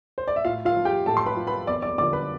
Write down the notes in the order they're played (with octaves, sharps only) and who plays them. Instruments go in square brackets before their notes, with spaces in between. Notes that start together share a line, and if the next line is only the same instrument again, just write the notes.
[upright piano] C5
D5
E5
A2 F4 F5
F4 F5
F3
G4 G5
A2 A4 A5
C6
B4 B5
F3
B4 B5
E2 D5 D6
D5 D6
D3 D5 D6
F3
B4 B5